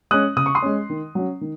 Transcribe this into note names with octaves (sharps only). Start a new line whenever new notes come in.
G#3 C#4 D#6 F#6
C#3 D#6
C#6
C6 D#6
G#3 C#4
D#3
F#3 C#4
D#3